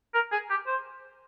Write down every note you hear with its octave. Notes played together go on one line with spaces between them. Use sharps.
A#4
G#4
G4
C5